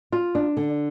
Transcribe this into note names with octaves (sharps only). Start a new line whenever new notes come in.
F4
D4
D3